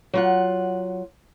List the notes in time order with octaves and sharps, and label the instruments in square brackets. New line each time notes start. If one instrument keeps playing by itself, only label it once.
[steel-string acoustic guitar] F#3 F4 F#5